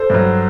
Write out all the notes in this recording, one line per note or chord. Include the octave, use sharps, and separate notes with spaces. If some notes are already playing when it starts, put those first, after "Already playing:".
Already playing: A4 C5
G2 F#3